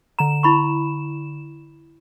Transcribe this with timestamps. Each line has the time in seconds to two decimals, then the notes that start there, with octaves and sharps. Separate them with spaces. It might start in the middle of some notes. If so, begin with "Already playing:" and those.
0.19 D3 A#5 E7
0.43 E4 B5 C#6